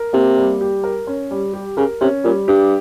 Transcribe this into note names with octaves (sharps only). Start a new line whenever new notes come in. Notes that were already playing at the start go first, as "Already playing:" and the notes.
Already playing: A#4
C3 A#3
G3
G4
A#4
C#4
G3
G4
C#3 A#4
C3 C#4
A#2 G3
G2 G4